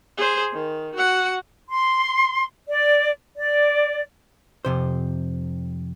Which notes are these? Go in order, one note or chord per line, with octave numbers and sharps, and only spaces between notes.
G#4 C5
D#3
F#4 F#5
C6
D5
D5
F2 C3 C5